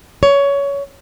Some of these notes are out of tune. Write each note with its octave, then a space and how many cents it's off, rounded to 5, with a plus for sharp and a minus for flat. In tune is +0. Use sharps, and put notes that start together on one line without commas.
C#5 +20